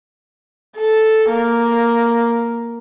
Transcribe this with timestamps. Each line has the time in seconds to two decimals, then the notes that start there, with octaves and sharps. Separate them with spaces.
0.77 A4
1.29 A#3